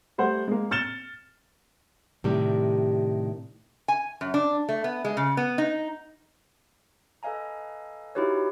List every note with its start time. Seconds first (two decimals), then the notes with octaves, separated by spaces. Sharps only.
0.18 G3 A3 C5 F#5
0.47 G#3 A#3
0.71 F6 A6 C#7 E7 G7
2.24 A2 C3 D#3 G3 G4 D5
3.88 G#5
4.21 F#2
4.34 D4
4.69 A3
4.84 B3
5.05 G#3
5.17 C#3
5.37 B3
5.58 D#4
7.23 A4 B4 D#5 F5 G#5 A#5
8.15 D#4 E4 F#4 G4 B4 C#5